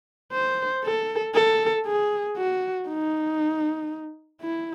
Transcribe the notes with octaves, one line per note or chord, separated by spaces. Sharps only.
C5
A4
A4
G#4
F#4
D#4
E4